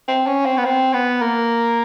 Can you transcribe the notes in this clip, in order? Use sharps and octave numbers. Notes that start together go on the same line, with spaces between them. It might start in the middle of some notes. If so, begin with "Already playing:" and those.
C4
C#4
C4
B3
C4
B3
A#3